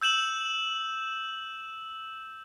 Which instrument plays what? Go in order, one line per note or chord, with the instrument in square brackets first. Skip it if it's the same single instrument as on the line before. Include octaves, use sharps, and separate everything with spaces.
[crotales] E6 G6 E7 F#7